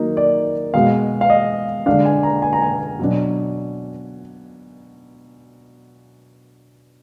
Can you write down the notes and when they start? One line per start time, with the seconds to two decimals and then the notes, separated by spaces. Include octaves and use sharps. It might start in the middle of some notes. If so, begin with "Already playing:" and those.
Already playing: D#3 F#3 A#3 D#4
0.17 D5
0.74 B2 G#3 B3 F5
1.21 F5
1.30 D#5
1.86 D3 G#3 D4 F5
2.05 G#5
2.23 A#5
2.42 G#5
2.53 A#5
2.62 G#5
2.99 B2 F#3 D4